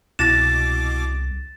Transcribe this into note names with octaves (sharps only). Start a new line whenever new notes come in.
C2 B2 C4 E4 D6 A6 A#6 E7